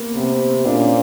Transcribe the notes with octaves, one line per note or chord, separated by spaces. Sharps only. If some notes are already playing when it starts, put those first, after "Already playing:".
Already playing: A#3 B3
C3 B3
C4
A#2 D4
C#4
C4